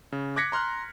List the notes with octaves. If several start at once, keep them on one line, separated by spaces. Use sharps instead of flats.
C#3
D6 F#6 G#6 A#6 B6 C#7
A#5 C6 F6 F#6